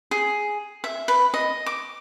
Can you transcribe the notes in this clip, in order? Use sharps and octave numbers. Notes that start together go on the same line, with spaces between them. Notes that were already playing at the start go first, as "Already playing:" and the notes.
G#4
E5
B4
D#5
D6